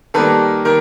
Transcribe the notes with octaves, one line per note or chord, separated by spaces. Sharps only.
D#3 G3 A#3 A4 B4
D#3 A#4